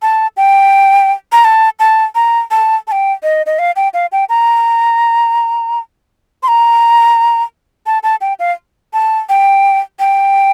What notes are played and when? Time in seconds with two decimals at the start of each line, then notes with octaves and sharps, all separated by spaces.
0.02 A5
0.37 G5
1.32 A#5
1.45 A5
1.79 A5
2.15 A#5
2.51 A5
2.88 A5
2.92 G5
3.23 D#5
3.46 D#5
3.59 F5
3.76 G5
3.94 F5
4.12 G5
4.29 A#5
6.43 C6
6.48 A#5
7.86 A5
8.03 A5
8.21 G5
8.39 F5
8.93 A5
9.29 G5
9.99 G5